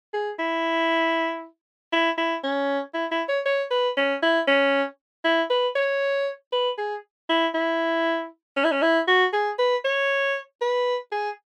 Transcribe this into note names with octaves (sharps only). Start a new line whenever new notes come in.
G#4
E4
E4
E4
C#4
E4
E4
C#5
C#5
B4
C#4
E4
C#4
E4
B4
C#5
B4
G#4
E4
E4
C#4
E4
C#4
E4
F#4
G#4
B4
C#5
B4
G#4